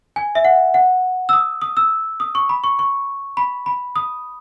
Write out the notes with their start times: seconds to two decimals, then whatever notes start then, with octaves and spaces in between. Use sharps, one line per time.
0.16 G#5
0.35 E5
0.45 F#5
0.74 F#5
1.29 E6
1.33 D#6
1.62 D#6
1.77 E6
2.20 D#6
2.35 C#6
2.49 B5
2.64 C#6
2.79 C#6
3.37 B5
3.66 B5
3.96 D#6